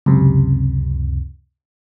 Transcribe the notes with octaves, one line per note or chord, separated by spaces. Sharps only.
C#2 F#2 C3